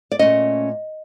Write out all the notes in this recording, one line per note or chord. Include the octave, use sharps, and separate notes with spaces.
D5
A#2 F3 A3 C#4 D#5